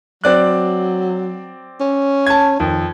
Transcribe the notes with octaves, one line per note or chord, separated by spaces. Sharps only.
F#3 C4 D5 F#6
C#4
A5 G#6
F2 D#3